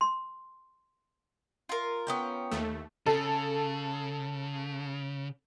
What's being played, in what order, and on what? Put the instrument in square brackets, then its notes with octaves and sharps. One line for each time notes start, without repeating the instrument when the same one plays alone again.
[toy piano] C6
[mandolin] F4 A#4
[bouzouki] B3 C#4 G5
[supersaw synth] D#2 A3
[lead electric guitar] C#3 [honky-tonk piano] A4